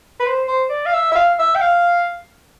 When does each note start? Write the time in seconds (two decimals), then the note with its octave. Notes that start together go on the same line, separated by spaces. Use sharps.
0.20 B4
0.26 C5
0.48 C5
0.70 D5
0.86 F5
0.93 E5
1.12 E5
1.15 F5
1.39 E5
1.55 G5
1.61 F5